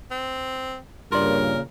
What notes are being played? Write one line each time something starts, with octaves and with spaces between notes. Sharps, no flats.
C4
G2 A#2 C#3 F4 A#4 D5